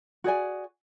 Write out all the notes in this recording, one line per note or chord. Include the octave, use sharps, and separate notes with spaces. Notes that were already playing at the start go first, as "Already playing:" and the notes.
F#4 G#4 D5 G#5